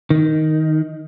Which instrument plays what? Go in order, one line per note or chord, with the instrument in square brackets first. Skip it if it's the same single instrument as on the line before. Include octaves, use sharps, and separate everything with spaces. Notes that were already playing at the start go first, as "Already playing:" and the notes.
[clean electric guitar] D#3